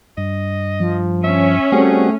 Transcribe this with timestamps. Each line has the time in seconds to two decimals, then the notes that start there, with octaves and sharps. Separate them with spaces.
0.17 G2 D#5
0.80 F3
1.24 C#4 E5
1.72 G3 A3 C4 F#4 G#4